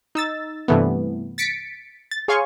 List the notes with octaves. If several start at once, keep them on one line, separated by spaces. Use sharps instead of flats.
D#4 E6 A6
G2 C3 E3 A3 B3
A6 B6 C#7 D7
A6
G#4 C#5 F5 G#5 C6 C#6